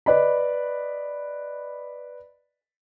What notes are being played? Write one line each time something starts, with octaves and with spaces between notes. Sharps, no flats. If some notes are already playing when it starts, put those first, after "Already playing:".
B4 D5 D#5 B5